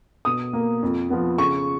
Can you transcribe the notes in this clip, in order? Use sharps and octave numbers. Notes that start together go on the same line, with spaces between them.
B2 D#6
A#3
F2
F3 B3
C#3 C#6